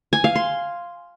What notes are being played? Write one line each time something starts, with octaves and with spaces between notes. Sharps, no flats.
G#5
F5
C6